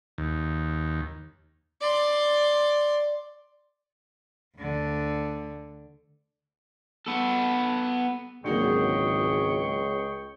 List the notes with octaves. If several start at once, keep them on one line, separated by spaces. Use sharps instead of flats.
D#2
D5 C6
D2 D3
B3 A4
G#1 C#2 D3 F#3 A#3 G#4 G5 C#6